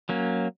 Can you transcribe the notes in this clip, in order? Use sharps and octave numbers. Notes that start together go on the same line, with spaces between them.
F#3 A#3 C#4